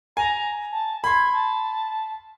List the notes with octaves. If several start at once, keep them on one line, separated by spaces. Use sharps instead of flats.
G#5 A#5
A5
B5 C6 G#6
A5